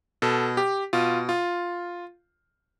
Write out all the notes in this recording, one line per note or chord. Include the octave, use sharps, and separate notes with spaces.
B2 A4
G4
B2 F4
F4